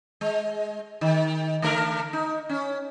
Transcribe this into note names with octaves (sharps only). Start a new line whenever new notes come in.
G#3
D#3
D3 A3 A#4
D#4
C#4